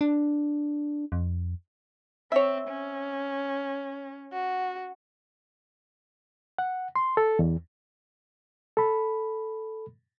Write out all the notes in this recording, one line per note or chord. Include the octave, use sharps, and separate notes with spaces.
D4
F2
C4 C#5 E5
C#4
F#4
F#5
C6
A4
E2
A4 B5